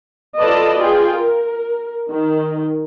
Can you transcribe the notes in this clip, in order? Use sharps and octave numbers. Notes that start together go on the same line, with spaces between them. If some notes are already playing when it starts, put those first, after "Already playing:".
F4 A4 B4 D5 D#5 A5
F4 G#4 G5
A#4
D#3